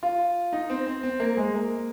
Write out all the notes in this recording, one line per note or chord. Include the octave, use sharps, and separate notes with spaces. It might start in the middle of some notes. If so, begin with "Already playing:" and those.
F4
D#4
C4
C4
C4
A#3
G#3
A#3